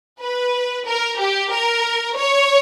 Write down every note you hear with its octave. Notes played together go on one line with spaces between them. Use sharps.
B4
A#4
G4
A#4
C#5